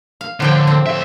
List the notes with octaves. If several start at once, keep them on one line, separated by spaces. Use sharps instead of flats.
F5
A2 D3 F3 G5
C4
D2 E5